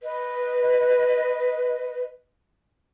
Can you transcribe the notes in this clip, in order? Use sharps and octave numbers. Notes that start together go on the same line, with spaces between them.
B4 D#5